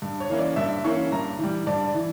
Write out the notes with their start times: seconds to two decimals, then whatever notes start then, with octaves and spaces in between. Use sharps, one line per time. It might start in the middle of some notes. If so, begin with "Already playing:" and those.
0.02 G2
0.20 C#5
0.30 E3 A#3 C#4 E4
0.39 D5
0.56 G2 E5
0.84 E3 A#3 C#4 E4 C#6
1.12 G2 A#5
1.39 E3 G3
1.67 G2 D5
1.94 E3